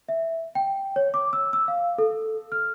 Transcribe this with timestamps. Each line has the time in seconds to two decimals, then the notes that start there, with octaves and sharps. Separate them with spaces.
0.09 E5
0.55 G5
0.96 C#5
1.14 D6
1.33 E6
1.53 E6
1.68 F5
1.98 A4
2.52 F6